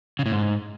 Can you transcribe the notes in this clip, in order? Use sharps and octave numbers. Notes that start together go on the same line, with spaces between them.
C#3
A2
G#2